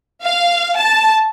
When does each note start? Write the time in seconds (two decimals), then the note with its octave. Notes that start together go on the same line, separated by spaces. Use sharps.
0.23 F5
0.76 A5